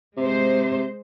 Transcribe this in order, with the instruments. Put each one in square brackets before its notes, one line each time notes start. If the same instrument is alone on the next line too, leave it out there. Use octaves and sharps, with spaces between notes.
[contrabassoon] C3 [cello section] G#3 C5